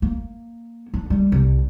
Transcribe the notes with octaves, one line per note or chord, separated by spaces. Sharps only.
A#3
D4
G3
C2